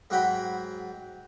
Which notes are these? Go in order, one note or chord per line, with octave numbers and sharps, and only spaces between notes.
G#2 F#3 F#5 G5 B5